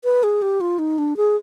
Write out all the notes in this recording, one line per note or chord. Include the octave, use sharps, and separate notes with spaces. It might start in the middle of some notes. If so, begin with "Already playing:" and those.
B4
G#4
G4
F4
D#4
D4
G#4